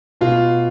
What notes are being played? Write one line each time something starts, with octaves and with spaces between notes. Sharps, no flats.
B2 F4